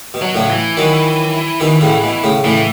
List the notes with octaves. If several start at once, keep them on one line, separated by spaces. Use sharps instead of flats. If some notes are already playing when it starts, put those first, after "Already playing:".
B2
F#3
A2 C#3
E3
D#3 F#3
B2 D#3
A2 C#3
B2
A2 C#3
A2 C#3 E3